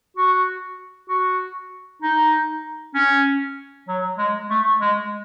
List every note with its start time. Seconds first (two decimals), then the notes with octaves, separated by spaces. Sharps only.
0.17 F#4
1.09 F#4
2.02 D#4
2.95 C#4
3.88 F#3
4.18 G#3
4.50 A3
4.81 G#3